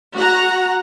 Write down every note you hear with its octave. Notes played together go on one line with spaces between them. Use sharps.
F#4 F#5 A#5